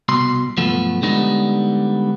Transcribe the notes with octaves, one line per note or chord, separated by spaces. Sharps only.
C2 B2 C6
B1 G2 F3 A3 B3
D3 G3 G#3 B3 D#4